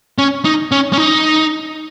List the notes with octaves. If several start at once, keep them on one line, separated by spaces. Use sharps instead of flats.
C#4
D#4
C#4
C#4
D#4